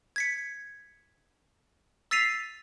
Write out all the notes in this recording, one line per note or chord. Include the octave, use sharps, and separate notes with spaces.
G#6 B6 C#7
E6 A6 B6 C7 D#7 F7